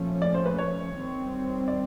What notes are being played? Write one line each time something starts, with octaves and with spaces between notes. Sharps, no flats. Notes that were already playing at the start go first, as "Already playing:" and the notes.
Already playing: A#2 F3 A3 C#4
D5
C5
B4
C#5
D#3 G3 C4
D5